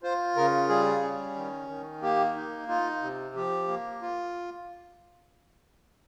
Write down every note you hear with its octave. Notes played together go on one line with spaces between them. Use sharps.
F4 C5
C#3 A#4
G3 G#4
C#4
D#3
D#3
A#3 G4
D#4
D#4 F4
C3
F3 G4
A#3
F4